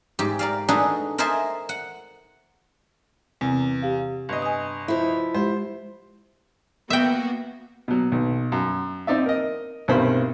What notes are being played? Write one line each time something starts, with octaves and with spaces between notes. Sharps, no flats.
G#2 G4
A#4 D5 F5
D4 D#4 F#4 G#4 A4 B4
A#4 C5 D#5 E5 G#5 A5
F#5
E2 C3 C4
G4 F5
G1 D#5
G#5 D#6
F3 E4
G#3 G4 C5
A#3 B3 F#4 E5 G5
B2 F#3
B1
F#2
C4 D#4 D5 E5
A#4 D#5
B1 G2 C3 A#3 C5 B5